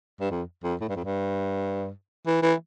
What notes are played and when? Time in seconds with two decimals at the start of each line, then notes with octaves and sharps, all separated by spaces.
0.20 G2
0.31 F2
0.64 F2
0.81 A2
0.89 G2
0.96 F2
1.05 G2
2.27 E3
2.42 E3